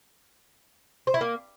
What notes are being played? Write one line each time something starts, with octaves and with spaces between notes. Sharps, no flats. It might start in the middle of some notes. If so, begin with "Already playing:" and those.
C5
E4
A#3